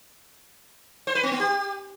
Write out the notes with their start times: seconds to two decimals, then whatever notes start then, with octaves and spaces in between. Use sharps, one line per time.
1.07 C5
1.15 B4
1.23 C4
1.32 B3
1.40 G4